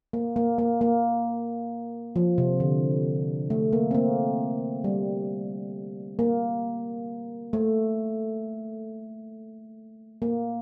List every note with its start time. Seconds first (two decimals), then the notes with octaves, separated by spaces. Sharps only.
0.13 A#3
0.36 A#3
0.58 A#3
0.81 A#3
2.16 F3
2.38 C3
2.60 D3
3.50 A3
3.73 A#3
3.91 C4
3.95 A#3
4.84 G3
6.19 A#3
7.53 A3
10.22 A#3